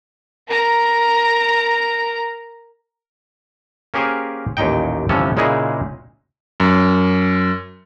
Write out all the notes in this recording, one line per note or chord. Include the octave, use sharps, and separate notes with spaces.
A#4 A#5
A#3 C#4 G4 G#4 A#4 C5
A1 D#2 A#2 D#4 G5
G1 C3 E3 F3 C#4 A4
A#2 C#3 G#3 D#4 E4 G#4
F#2